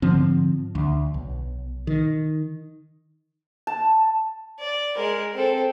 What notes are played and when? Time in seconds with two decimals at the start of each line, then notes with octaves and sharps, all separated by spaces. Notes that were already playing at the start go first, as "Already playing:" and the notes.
0.02 G#2 D3 F3 C4
0.75 D2
1.14 B1
1.87 D#3
3.67 A5
4.60 D5
4.96 G#3 A#4
5.34 C4 A4